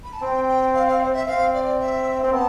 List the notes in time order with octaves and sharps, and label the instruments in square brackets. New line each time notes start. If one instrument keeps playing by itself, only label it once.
[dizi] B5
A5
[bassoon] C4 [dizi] G5
[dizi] G5
F5
F5
C5
E5
[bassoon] C4 [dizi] F5
[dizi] D5
E5
[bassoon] C4
[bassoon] B3 [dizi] A5